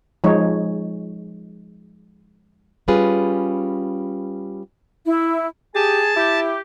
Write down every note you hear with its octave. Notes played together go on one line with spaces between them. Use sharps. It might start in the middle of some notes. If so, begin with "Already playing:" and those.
F3 G#3 D#4 C#5
G3 C#4 F4 G#4 B4
E4
G4 G#4 G#5 A5
E4 G4